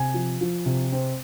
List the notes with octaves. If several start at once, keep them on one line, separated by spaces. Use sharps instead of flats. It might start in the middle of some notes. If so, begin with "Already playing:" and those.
Already playing: C3 G#5
F3
F3
C3
C4